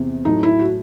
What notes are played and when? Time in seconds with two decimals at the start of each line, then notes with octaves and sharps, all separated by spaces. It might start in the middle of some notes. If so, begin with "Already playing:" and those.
Already playing: E2 C3 E3 C4
0.25 A2 F#3 A3 D#4
0.43 E4
0.59 F#4